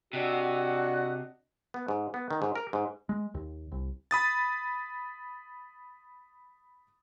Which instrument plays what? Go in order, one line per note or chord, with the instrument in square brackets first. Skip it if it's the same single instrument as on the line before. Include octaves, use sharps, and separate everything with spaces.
[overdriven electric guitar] C3 [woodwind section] D4 D#5 F#5 [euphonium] F#4
[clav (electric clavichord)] B3
G#2
B3
D#3
G#2
A#4
G#2
[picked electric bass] G#3
D#2
C2
[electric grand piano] B5 D#6 A6